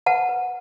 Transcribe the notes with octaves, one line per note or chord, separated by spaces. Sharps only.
B4 F#5 A5
B4